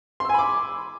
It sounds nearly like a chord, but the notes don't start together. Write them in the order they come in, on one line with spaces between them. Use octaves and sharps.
C6 E6 G#5 B5 D6